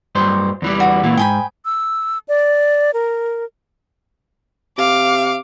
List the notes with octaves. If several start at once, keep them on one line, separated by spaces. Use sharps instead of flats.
G2 F#3 C5
E2 E3 G3
F#4
A#2 E3
G#2 G5 G#5 B5
E6
D5
A#4
C3 F5 D6